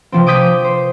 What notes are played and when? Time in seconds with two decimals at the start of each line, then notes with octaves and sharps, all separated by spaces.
0.12 C3 F3 C4
0.26 D6 D#6 G6 B6
0.65 C5